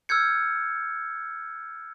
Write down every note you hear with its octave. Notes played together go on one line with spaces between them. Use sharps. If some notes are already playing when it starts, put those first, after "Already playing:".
E6 F6 G6 G#6 C#7